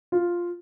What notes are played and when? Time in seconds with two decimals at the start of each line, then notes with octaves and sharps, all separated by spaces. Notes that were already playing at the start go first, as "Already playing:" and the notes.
0.12 F4